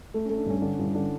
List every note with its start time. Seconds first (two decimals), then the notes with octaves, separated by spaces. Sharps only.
0.14 A3
0.26 C#4
0.29 A3
0.38 D4
0.46 G2 C#4
0.62 D3 D4
0.79 G2 E4
0.95 D3 D4